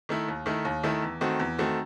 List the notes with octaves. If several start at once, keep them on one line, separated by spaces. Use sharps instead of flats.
D#3 A3 E4
D#2
D#3 A3 E4
D#2
D#3 A3 E4
E2
D#3 A3 C4 F#4
E2
D#3 A3 C4 F#4